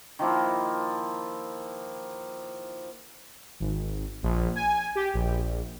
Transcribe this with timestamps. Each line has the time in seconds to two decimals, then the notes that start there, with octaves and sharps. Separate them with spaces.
0.19 D#3 F3 A#3 E4
3.60 G#1
4.23 A#1
4.56 G#5
4.95 G4
5.14 A#1